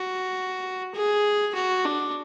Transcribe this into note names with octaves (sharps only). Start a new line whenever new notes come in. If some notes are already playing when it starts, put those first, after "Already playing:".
Already playing: F#4
G#4
F#4
D4